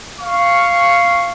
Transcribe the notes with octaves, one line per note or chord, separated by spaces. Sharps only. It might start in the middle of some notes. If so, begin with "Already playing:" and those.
F5 C#6